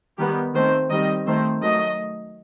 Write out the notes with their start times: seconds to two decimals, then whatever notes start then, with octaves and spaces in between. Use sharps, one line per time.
0.18 D#3 G3 B3 G4
0.54 D#3 A3 C4 C5
0.90 D#3 G3 C4 D#5
1.25 D#3 A3 C4 C5
1.62 D#3 F#3 A3 D#5